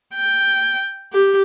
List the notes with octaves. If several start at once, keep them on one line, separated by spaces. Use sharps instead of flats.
G5
G4